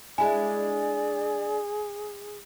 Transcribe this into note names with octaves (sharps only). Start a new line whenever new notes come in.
G#3 D4 E4 G#4 D5 G#5